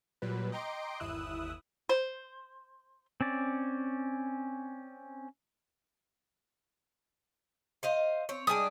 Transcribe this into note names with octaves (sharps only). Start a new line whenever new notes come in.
A#2 F#3 G3 B4
D#5 G5 A#5 C6 D6 D7
G1 D#2 E4 D#6 E6 F#6
C5
C4 C#4 D5
C5 D#5 F5
C4 C#5
G3 G#3 D4 G#5 D#6